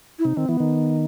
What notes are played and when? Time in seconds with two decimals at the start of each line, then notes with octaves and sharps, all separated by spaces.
0.19 E4
0.25 C3 D#4
0.37 D#3 C4
0.49 E3 B3
0.60 D#3